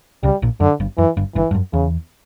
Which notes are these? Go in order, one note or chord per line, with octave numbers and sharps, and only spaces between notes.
C#2 C#3 G3
A#1 A#2
F#2 D3
G1 G2
F#2 E3
G1 G2
G1 G2 E3
G2
F#2
E2 C#3